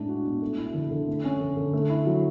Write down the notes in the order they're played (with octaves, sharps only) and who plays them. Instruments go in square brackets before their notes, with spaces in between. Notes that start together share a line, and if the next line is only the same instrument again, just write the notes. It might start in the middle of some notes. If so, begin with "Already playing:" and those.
Already playing: [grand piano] A2 G#3 D4
F#4
B2
A3
E4
D3
D3
A3
C#4
D3
D3
A3
E4
F#3